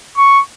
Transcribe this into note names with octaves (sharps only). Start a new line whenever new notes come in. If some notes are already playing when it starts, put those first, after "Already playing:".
C#6